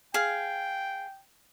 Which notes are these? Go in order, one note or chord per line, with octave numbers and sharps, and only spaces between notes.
G#4 F5 G5